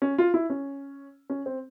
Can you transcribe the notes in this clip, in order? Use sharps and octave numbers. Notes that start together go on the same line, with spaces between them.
C#4
F4
E4
C#4
C#4
C4